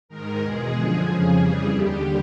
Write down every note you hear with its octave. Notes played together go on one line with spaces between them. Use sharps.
G#2 D#3 G#3 A#4
E2 B2 G#3 G#4
F#2 D3 F3 G#3 G#4
F2 C#3 F3 G#4
F2 C#3 E3 G3
D#2 D3 G3 G4